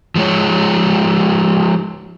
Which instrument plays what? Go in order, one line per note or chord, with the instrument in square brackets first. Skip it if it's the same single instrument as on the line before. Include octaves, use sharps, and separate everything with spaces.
[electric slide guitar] F3 G#3 C#5